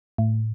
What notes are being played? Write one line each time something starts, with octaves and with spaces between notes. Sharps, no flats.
A2